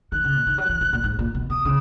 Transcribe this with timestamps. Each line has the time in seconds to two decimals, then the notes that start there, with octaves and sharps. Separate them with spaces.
0.12 D#3 F#6
0.24 C#3
0.35 A#2
0.47 D#3
0.58 F#3
0.69 E3
0.81 E3
0.93 A#2
1.04 G#2
1.19 A#2
1.35 B2
1.50 B2 D#6
1.65 C#3